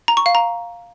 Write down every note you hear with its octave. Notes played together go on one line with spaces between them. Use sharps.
A#5
C#6
F5
A#5